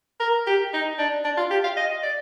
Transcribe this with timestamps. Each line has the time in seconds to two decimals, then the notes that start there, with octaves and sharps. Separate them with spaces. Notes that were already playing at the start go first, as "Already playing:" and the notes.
0.20 A#4
0.47 G4
0.73 D#4
0.99 D4
1.24 D4
1.38 F4
1.51 G4
1.64 F5
1.77 D#5
2.03 D5